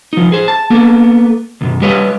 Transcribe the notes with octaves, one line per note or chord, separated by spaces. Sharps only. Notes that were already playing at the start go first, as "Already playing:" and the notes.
F3 D#4
G#4 C5
A5
A#3 B3 A4
C#2 F#2 B2
G3 G4 B4 C#5 D#5 F5